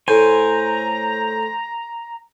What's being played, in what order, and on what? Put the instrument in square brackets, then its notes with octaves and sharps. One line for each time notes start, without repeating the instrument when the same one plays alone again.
[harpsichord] A2 [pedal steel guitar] C5 G#5 [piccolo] A#5